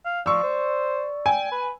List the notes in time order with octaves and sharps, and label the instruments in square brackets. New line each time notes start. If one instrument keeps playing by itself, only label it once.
[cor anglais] F5
[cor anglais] F3 [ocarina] D5 [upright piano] C#6 E6
[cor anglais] C5
[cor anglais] G5 [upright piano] G#5
[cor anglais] B4